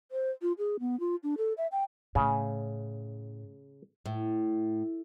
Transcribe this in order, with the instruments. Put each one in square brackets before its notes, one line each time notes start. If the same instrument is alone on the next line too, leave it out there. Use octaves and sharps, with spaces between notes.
[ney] C5
F4
G#4
B3
F4
D4
A4
E5
G5
[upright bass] A2 [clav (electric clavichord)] C#3
[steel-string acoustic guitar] A2